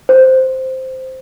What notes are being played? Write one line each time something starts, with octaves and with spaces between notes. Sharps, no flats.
C5